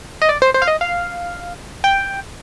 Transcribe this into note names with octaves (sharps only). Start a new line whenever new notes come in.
D#5
D5
C5
C5
F5
D#5
F5
G5